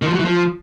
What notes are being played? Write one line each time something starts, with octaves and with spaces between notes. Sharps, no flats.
D#3
F3
F#3
E3
F3